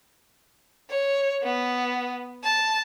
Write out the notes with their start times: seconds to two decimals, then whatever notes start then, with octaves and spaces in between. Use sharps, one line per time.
0.89 C#5
1.43 B3
2.44 A5